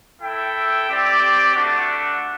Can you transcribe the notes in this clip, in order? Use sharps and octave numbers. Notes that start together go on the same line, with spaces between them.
E4 A4 E5 G5
C4 G4 D5
A3 D4 F#4